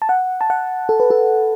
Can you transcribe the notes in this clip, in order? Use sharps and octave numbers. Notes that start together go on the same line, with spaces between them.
A5
F#5
A5
F#5
A4
B4
A4